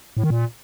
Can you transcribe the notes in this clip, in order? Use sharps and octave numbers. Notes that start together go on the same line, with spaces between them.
A2
D#3
A#2